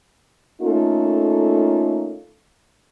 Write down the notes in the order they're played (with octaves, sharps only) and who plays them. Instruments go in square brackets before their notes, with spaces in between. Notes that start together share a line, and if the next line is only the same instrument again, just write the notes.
[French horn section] A3 A#3 C#4 D#4 F4 A4